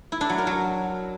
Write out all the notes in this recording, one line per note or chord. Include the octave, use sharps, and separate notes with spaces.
E4
D4
F#3
A#4
F#3